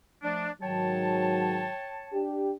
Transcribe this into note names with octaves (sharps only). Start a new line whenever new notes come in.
F3 A3 D4
G#2 D#3 F#3 C#5 G5 A5
D4 G4